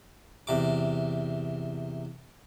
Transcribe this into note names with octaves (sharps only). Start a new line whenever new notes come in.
E2 C3 D6